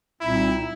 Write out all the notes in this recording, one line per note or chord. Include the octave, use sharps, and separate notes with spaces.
C2 A#2 G3 C4 D#4 E4